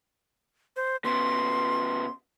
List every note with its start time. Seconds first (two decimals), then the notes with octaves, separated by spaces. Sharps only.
0.76 C5
1.05 C#3 B3 C6